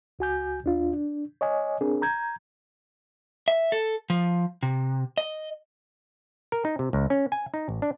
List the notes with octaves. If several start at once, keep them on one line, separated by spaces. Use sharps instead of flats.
C#2 F#4 G#5 G6
D#2 D4 F4
D4
C#5 D#5 G#5
C4 D4 G#4 A#4
A#5 G6 G#6
E5
A4
F3
C3
D#5
A#4
D#4
C3
C#2
C#4
G#5
D#4
A1
D4